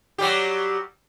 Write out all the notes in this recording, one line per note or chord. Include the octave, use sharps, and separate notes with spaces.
F#3 G3 G4